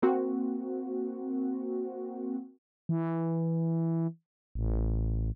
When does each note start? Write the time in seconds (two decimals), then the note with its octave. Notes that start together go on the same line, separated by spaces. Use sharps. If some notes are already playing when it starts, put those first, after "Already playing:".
0.02 A#3 C4 F#4
2.89 E3
4.55 A1